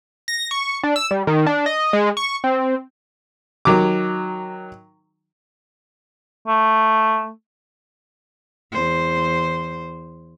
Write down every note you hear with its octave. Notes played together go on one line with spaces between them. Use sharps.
A#6
C#6
D4
E6
G3
D#3
D4
D#5
G#3
C#6
C4
D#3 F#3 D6
A3
E2 C5